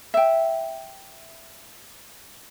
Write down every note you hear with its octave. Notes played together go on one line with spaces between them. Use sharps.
E5 G5